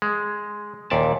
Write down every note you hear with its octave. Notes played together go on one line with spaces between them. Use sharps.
G#3
D#2 A#2 D5 E5 A5